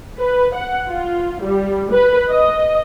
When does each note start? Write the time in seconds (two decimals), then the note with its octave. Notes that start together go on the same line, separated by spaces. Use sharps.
0.19 B4
0.55 F#5
0.88 F4
1.41 G3
1.92 B4
2.31 D#5